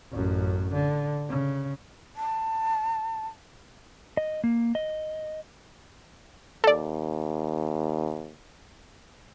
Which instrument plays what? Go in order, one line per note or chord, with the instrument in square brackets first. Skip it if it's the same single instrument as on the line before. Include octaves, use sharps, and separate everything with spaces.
[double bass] A1 F#2
D3
C#3
[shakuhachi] A5
[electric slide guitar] D#5
A#3
D#5
[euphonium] D#2 [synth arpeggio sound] A4 D5